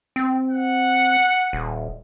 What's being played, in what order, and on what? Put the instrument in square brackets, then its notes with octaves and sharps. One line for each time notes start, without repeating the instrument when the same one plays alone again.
[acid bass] C4
[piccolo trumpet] F#5
[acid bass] D#1